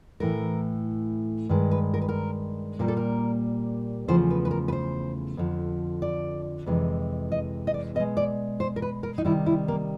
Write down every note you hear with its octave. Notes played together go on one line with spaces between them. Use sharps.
A2 E3 A3 A#4
G2 D#3 G#3
B4
A#4
B4
A#4
A#2 G3 A#3 A#4
A4
A#4
E2 C#3 F3 A3 C5
B4
B4
A#4
B4
C5
F2 D3 F3
D5
F2 C3 E3 G#3
D#5
D#5
D5
B2 G#3 D#5
D5
C5
A#4
B4
A#4
D#4
C3 D#3 G3 E4
E4
A#3